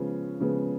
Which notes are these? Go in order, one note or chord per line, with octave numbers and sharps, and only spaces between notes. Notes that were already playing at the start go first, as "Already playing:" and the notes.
Already playing: C#3 F3 G#3 B3
C#3 F3 G#3 B3